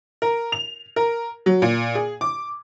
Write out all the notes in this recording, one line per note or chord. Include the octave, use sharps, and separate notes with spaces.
A#4
F7
A#4
F#3
A#2
G#4
D6